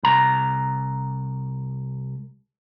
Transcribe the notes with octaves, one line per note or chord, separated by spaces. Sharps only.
C2 A#5